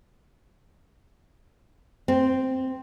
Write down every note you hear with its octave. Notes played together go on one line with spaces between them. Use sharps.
C4